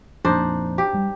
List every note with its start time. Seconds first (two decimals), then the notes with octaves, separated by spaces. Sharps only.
0.25 F2 A#2 D4 D#4 C5
0.78 G4
0.93 G2 G3